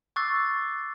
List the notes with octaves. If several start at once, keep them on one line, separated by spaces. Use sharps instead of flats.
C#6 D6 E6 F#6 A6 C7